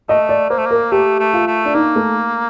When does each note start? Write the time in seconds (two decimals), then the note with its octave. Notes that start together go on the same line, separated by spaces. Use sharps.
0.09 A3 D#5
0.29 D5
0.50 A#3 C5
0.58 A3
0.66 A#3 A#4
0.92 A3 G4
1.20 A3
1.33 F4
1.47 A3
1.65 D4
1.75 A#3 D#4
1.96 A3